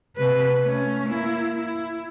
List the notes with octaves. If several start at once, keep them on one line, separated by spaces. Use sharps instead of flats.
C3 B4
A3 C#4
A#3 E4
E4